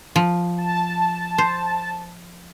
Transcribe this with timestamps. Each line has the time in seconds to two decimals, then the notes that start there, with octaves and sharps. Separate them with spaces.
0.16 F3
0.58 A5
1.38 C5